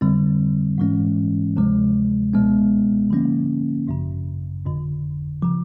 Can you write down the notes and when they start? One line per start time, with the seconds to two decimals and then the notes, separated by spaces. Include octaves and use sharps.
0.01 F2 D3 G3 C4
0.78 G#2 E3 G#3 C#4
1.56 D2 C3 F3 G#3
2.33 C#2 B2 G#3 B3
3.10 D3 F3 A#3 C#4
3.88 G#1 F#2 C#3
4.65 G1 F2 D3
5.42 C#3 F3